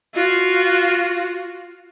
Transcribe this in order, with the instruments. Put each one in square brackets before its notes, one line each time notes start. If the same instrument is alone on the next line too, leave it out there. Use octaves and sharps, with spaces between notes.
[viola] F4 F#4